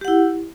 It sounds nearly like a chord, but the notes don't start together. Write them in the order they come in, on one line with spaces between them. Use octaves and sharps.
G4 F#5 E4